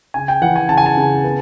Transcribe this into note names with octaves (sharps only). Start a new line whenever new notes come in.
C#3 G#5
G5
E3 F#5
G#5
C#3 A5
G#5
A5
C#3
B3